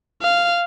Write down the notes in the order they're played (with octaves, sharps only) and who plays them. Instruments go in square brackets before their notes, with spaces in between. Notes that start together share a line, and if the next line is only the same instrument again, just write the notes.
[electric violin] F5